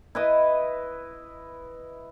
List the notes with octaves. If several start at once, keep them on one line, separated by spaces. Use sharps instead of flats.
E4 B4 D#5